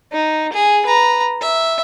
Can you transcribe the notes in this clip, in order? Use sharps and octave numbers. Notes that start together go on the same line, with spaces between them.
D#4
G#4
B4 A#5
E5